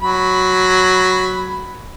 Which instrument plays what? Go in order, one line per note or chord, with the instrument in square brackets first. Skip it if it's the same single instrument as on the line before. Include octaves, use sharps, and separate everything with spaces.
[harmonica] F#3 B5